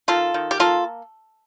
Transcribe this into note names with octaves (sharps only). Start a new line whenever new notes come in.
D#3 F4 A4
D#3
G4
A#3 F4 A4